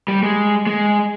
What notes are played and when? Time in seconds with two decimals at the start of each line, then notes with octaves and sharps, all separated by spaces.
0.08 G3
0.23 G#3
0.67 G#3